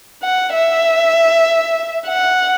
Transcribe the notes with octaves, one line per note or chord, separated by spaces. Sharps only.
F#5
E5
F#5